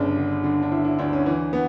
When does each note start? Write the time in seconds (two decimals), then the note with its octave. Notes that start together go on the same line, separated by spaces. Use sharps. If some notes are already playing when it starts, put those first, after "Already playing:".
Already playing: G1 C#3 D4
0.17 D3
0.44 D3
0.62 D4
0.72 D3 E4
0.85 E4
0.99 D2 D4
1.13 C#4
1.26 E3
1.53 B3